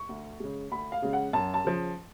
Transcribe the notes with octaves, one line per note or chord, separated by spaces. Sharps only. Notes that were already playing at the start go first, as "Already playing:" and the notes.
Already playing: C#6
D2
C#3 G#3
D2 B5
F5
C#3 G#3
F#5
F#2 A5
A5
C#3 F3